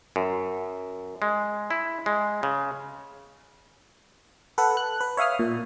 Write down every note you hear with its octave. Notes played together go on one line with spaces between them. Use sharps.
F#2
G#3
E4
G#3
C#3
A4 B4 F#5
F#6
B4
C#5 E5 F5 D#6 F6
A#2